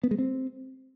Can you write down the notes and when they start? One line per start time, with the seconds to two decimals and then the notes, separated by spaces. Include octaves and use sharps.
0.03 B3
0.11 G#3
0.18 C4